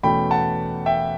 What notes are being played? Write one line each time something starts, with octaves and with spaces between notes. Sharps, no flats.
E2 B2 A3 C#4 G5 B5
F#5 A5
E5 G5